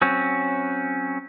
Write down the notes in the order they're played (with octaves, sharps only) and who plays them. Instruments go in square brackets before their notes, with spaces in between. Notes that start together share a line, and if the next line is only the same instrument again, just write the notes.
[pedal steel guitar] F#3 C4 C#4